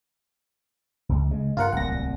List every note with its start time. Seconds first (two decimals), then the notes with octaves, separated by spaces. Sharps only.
1.09 C#2
1.31 C#3 G#3
1.57 G2 F4 A#4 F#5
1.72 D1 C2 A#2 F#5 A#6